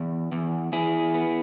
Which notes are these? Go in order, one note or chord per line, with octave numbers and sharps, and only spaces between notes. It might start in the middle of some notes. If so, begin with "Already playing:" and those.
Already playing: E2
E2
E2 E4 G#4
B3